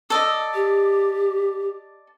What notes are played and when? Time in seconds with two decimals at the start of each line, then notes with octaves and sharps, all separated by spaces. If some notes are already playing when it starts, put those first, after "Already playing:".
0.10 A4 D5 D#5 E6
0.54 G4